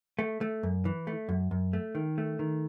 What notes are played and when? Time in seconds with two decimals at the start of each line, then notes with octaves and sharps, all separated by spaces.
0.19 A3
0.41 A3
0.63 F#2
0.85 E3
1.07 A3
1.29 F#2
1.51 F#2
1.73 A3
1.95 D#3
2.18 A3
2.39 D#3